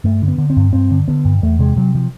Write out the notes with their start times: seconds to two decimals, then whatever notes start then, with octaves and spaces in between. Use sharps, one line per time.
0.04 G2 A3
0.22 D3
0.28 B3
0.38 D3
0.50 C4
0.57 G2
0.73 G2 C4
0.91 D3
1.08 D3 B3
1.25 G2
1.42 E2 A3
1.59 C3 G#3
1.76 C3 F#3
1.95 F3